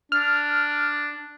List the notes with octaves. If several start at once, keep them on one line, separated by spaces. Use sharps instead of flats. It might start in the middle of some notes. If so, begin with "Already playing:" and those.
D4 F6